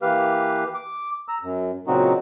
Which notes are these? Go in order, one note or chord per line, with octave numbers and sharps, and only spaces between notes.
E3 A#3 G4 B4 F5 F6
D6
A#5 E6
F#2
A#2 C#3 F#3 C4 D#4 F#4